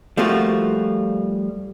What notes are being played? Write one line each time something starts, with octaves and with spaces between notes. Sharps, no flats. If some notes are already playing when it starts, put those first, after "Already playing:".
F3 G3 A3 A#3 F4 F#4